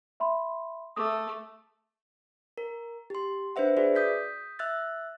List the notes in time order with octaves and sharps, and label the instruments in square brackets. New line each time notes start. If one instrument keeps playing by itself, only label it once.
[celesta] E5 B5 C6
[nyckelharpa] A3 [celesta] D6 D#6
[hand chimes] A#4
G4 C6
D4 B4 C5 E5 F#5
F#4 G#4 B4 D5 E5
D#6 G6 B6
E5 E6 F#6 A6